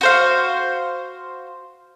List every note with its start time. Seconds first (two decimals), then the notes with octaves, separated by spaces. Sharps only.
0.01 F#4 C5 F5